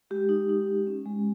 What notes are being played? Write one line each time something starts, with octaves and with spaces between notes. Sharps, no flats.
G#3 G4
D#4
D#4
D#4
C#4
G#3